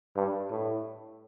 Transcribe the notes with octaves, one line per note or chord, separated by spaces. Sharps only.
G2
A2